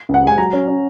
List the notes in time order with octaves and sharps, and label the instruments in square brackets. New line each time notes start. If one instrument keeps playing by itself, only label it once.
[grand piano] C#2
[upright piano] F#5
[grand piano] G#3 [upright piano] G#5
[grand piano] F#3 [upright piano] A#5
[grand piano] C#4
C#4